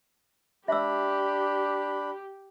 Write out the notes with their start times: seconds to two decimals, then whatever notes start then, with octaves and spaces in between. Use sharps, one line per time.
0.68 D4 G4 E5 B5 E6